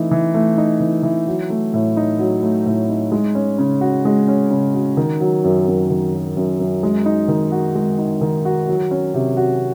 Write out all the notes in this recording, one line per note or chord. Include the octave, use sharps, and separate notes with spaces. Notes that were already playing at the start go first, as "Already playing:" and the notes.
Already playing: E3 A3 D#4
E3
A3
D#4
E3
E3
F#3
A3
A2
D#4
F#3
A3
A2
D#4
G#3
C#4
C#3
F#4
G#3
C#4
C#3
F#4
D#3
F#3
F#2
F#2
D#3
F#3
F#2
F#2
G#3
D#4
D#3
F#4
G#3
D#4
D#3
F#4
F#3
C#4
C3
F#4